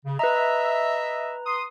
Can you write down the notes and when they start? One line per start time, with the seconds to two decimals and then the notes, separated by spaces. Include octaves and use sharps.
0.05 C#3
0.19 B4 D#5 E5 A#5
1.46 C6 D#6